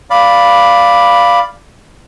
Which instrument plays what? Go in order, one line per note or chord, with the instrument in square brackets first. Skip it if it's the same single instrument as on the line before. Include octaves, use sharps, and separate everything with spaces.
[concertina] D5 F5 B5